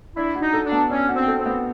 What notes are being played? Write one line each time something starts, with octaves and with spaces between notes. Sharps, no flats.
D4 E4
F#4
D#4
A4
D4
B3
C#4 D4
F#4
C4
A4
C4
B3